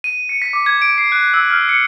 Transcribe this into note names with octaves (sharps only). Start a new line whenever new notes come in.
D#7
C#7
B6
D6
G#6
D7
C7
F#6
E6
F6
C#7